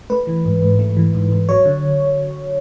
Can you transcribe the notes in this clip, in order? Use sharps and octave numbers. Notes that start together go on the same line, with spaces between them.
A3 B4
E3
G#2
G#2
A3
E3
G#2
G#2
F#3 C#5
D3